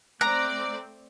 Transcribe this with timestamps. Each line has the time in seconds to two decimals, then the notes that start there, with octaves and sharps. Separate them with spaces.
0.21 A3 C4 D5 A#5 D6 F#6